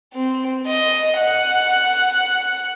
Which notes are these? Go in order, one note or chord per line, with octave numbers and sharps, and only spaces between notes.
C4
D#5
F#5